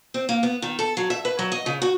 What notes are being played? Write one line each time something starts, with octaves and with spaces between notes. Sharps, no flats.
C4
A#3
B3
D#3
A4
F#3
E5
B4
F#3
D#5
C#3
F#4